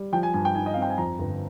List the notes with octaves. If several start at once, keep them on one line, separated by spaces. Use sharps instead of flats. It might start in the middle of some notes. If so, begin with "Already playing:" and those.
Already playing: G3
F3 G5
G#5
G2 G#5
G5
D#4 G#5
D#5
F5
C4
G5
G#5
F2 A#5
G1